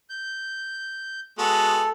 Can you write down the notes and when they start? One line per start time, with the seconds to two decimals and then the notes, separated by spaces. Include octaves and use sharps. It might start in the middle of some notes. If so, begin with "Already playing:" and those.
0.10 G6
1.38 G#3 B3 F#4 A4